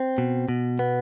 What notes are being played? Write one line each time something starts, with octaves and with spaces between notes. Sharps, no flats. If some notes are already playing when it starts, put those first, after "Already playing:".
Already playing: C4
B2
B2
B3